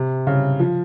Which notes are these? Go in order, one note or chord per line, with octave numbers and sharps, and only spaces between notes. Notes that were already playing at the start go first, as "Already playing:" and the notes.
Already playing: C3
C#3
F3